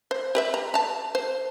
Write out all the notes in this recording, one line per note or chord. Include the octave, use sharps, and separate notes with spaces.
C5
G4 B4 E5
A#5
A5 A#5
C5